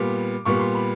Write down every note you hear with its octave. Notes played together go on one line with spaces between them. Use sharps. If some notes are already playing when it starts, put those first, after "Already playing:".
Already playing: A#2 G3 B3 D6
A#2 G3 B3 C#6
C6
B5